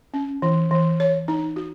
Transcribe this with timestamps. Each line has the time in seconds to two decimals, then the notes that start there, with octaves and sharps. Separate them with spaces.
0.14 C#4
0.42 E3
0.71 E3
1.00 C#5
1.28 D#4
1.56 F#4